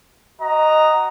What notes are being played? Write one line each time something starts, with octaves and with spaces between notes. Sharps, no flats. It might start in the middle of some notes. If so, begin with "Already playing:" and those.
F#4 D#5 A#5